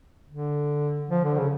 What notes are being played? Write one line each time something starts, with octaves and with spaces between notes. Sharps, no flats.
D3
F3
D3
C#3